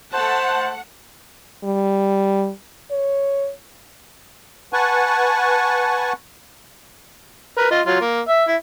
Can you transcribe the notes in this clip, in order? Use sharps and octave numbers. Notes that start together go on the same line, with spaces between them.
A3 C5 F#5 A5
G3
C#5
B4 F#5 G#5 A5 C#6
A#4 B4
F4 D#5
F#3 F4
A#3
E5
E4